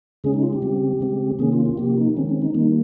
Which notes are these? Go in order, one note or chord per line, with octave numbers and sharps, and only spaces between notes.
C#3 G#3 C#4 G#4
D#4
F4
G4
C#3 G3 C4
C#3 G#3 C4
C3 D#3 A#3 C#4 G#4
F4
F4
C3 F3 A#3 G4
D#4
D#3 G#3 C4 C#4
C#4
D#4
D#3 G3 A#3 D#4